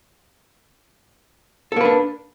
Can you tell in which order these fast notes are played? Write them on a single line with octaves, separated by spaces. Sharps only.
A4 A#3 B4 D4